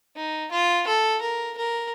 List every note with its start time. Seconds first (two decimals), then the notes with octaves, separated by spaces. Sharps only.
0.16 D#4
0.51 F4
0.87 A4
1.21 A#4
1.57 A#4